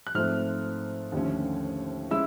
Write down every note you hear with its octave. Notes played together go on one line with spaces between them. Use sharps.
F#6
G#2 F3 A3 C4 F6
D#2 D3 F3 A3 C#4
G#3 C#4 E4 E6